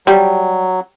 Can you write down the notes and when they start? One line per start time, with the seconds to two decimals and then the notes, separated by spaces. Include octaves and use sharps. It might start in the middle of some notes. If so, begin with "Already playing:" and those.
0.07 F#3 G3